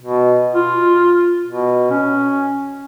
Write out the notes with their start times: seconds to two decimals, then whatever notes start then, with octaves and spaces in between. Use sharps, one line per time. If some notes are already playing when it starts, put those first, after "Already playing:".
0.01 B2
0.55 F4
1.47 B2
1.90 C#4